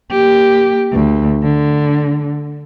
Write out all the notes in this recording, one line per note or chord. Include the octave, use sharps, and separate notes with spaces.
A#3 G4
D2
D3